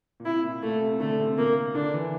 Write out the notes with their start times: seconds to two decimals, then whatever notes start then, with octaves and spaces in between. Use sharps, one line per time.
0.20 A#2
0.25 C3 E4
0.44 A#2
0.63 A#2 A3
0.82 C3
1.00 D3 A3
1.19 C3
1.38 A#2 A#3
1.75 D3 D4
1.94 E3